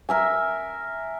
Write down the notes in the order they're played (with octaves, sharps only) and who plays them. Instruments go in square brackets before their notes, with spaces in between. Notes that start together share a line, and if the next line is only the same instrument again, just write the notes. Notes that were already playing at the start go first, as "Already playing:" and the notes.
[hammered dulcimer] A#4 E5 G#5